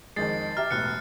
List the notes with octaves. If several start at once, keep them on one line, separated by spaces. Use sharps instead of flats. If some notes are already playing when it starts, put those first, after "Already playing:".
F2 D#3 G#3 A6 C7
G4 E5 A#5 F6
E1 A2 F6 F#6 C#7